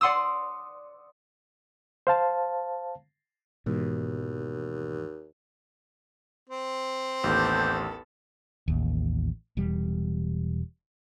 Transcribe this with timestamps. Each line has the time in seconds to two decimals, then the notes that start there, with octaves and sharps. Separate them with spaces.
0.01 D5 F#5 C6 D#6 E6
2.07 C5 F5 A5
3.66 D#2 G#2 B2 E3
6.49 C4
7.24 A1 D#2 B3 A4 D6 G6
8.68 A1 D#2
9.57 E1 E2 G3